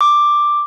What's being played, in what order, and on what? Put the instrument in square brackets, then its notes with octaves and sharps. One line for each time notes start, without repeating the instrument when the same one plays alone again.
[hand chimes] D6